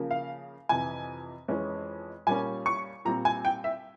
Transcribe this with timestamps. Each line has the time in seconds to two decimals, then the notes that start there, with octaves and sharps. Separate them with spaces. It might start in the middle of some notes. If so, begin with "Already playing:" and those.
Already playing: C#3 F3 A#3
0.11 F5
0.69 F2 C3 E3 G#5
1.48 F2 E3 G#3 C#4
2.27 A#2 G3 A#3 C#4 G#5
2.66 C#6
3.05 A#2 G3 C4 A#5
3.25 G#5
3.45 G5
3.64 E5